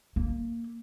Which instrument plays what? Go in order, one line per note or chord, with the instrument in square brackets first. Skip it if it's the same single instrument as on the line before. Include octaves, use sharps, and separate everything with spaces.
[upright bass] A#3